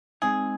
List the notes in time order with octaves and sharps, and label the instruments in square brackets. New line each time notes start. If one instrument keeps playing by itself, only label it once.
[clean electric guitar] G#3 C4 D#4 [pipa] G#4